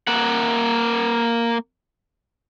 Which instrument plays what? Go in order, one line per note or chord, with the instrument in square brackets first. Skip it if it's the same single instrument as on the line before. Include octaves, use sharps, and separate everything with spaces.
[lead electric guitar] A#3 F#5